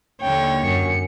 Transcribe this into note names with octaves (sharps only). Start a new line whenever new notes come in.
D#2 D3 C#5 G5
F#2 C#7